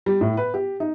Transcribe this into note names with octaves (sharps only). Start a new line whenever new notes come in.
G3
A2
B4
G4
D#4